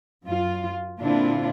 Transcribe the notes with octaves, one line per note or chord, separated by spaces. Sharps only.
F#2 F4
A#2 D3 C4 D4 E4 F4